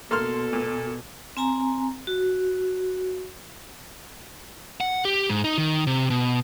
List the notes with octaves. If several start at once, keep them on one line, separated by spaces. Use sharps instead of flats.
B2 A#3 A4 C6 F6
A#2
C4 G#5 A#5
F#4
F#5
G4
G#2
D#4
D#3
C3
B2